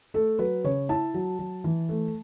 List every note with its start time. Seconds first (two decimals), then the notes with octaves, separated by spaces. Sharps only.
0.14 A3 A4
0.39 F#3 B4
0.64 C#3 C#5
0.89 E4 A5
1.14 F#3
1.39 F#3
1.64 E3
1.89 A3